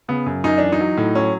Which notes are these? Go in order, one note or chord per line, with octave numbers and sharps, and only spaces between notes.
C#3 B3
F#2
F#2 D#4
E3 D4
D#4
F#3
A2
F#3 C#4